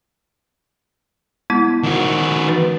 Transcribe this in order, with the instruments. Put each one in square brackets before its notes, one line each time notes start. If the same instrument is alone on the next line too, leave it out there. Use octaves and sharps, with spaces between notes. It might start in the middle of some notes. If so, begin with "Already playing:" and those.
[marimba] G#3 B3 E4
[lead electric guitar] D#3 F#4
[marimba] B4